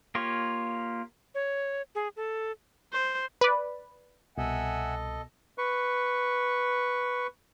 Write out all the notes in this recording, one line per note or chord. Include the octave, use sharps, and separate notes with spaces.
A#3 F4 G4 C#5
C#5
G#4
A4
C5
B4 D5
C2 B2 A4 D#5 E5 F#5 G#5
B4 C#6